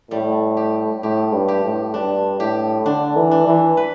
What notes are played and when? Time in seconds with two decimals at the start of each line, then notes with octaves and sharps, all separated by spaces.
0.11 A2 G3
0.57 G4
1.03 A2 G4
1.32 G2
1.48 G4
1.64 A2
1.94 G2 D4
2.39 A2 G4
2.85 D3 D4
3.16 E3
3.31 D4
3.47 E3
3.77 B4